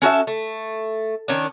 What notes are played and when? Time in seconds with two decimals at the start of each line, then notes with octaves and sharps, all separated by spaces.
0.02 C#4 F#4 A4 E5
0.27 A3
1.28 D#3 C#4 D4